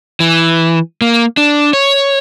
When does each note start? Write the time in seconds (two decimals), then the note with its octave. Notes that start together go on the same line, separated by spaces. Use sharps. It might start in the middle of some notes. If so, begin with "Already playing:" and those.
0.20 E3
1.01 A#3
1.37 D4
1.73 C#5